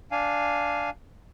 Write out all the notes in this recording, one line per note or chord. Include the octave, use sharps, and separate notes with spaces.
D4 F5 G#5